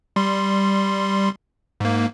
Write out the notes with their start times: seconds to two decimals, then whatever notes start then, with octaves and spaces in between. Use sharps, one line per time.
0.16 G3 C6
1.80 G#2 A#3